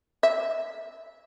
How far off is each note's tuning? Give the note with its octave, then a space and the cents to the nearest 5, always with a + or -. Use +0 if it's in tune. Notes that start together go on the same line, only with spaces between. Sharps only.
E5 -15